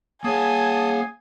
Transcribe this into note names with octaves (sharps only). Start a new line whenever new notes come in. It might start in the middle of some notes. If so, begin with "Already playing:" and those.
A#3 G#4 C#5 F5 F#5 G#5 A5 D#6